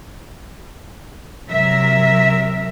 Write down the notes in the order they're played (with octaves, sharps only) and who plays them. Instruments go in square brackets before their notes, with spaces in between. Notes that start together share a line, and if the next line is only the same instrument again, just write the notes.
[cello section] C3 F#3 A#4 E5